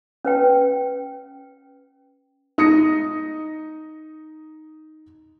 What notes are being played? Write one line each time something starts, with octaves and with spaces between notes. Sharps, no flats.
C#4 B4 G5
D#4 D#6 A#6 C#7